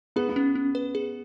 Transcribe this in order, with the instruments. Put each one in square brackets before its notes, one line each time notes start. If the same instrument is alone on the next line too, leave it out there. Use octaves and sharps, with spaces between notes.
[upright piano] B3 [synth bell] G#4
[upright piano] B3
[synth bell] C#4
C#4
B4
G#4